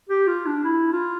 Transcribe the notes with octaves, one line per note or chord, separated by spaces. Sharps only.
G4
F4
D4
E4
F4